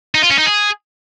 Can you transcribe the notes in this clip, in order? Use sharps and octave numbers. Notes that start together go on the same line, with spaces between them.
D#4
F4
C#4
D#4
G#4